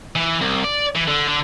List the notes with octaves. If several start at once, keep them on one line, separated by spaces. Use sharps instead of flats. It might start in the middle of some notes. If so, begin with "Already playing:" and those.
E3
C2
D5
E3
D3
D3